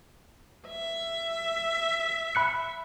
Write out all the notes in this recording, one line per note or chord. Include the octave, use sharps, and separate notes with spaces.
E5
B5 F#6 C#7